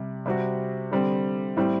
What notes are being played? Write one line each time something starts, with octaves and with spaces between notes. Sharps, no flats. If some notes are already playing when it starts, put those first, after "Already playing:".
Already playing: C3 G3
C3 G3 C4 F#4
D3 G3 C4
A2 G3 C4